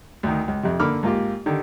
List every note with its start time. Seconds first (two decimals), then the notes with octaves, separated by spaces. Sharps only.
0.23 D2 D#3
0.48 C#2
0.63 F2 C3
0.80 D3 A#3 B5 D6 F6
1.03 G#2 A#3 F4 G4
1.46 D3 D#3 G4